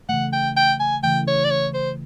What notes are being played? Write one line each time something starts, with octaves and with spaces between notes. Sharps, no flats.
C#3 E3 A3 F#5
G5
G5
G#5
C#3 E3 A3 G5
C#5
D5
C#5
C5